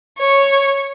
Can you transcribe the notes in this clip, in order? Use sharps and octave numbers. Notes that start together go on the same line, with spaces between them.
C#5